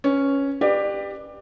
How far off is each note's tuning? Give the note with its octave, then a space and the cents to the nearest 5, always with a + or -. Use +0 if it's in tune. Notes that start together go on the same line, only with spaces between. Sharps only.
C#4 +0 B4 -10
G4 +10 B4 +0 D5 +30